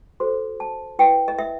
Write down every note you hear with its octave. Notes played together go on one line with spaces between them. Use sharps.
F#4 A4 C5 C6
A5
E4 B4 G5
D#5
E5